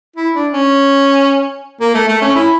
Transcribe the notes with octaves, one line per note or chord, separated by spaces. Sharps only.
E4
D4
C#4
A#3
A3
A3
C#4
E4